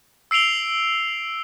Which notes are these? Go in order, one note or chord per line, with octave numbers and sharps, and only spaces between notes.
E6 C7 D7 F7 G7